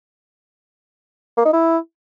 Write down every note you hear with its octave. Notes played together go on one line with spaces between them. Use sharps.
A#3
D#4
E4